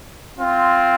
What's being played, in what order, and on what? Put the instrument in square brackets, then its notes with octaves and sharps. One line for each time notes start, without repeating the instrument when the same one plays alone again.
[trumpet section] C4 F4